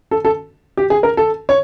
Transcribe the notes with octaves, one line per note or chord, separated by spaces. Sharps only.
A4
A4
G4
G#4
A#4
A4
C#5